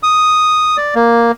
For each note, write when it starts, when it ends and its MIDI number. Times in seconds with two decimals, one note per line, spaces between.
0.03 0.77 87
0.77 0.95 74
0.95 1.32 58